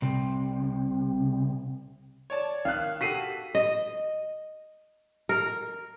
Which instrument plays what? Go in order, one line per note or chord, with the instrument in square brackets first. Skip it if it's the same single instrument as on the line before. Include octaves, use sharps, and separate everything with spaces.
[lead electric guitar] C2 C3
[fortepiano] C#5 D5 A5
[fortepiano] D#3 F#6 [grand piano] F5
[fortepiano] F#4 G4 A4 [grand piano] B6 C7 D#7
[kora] D#5
A#4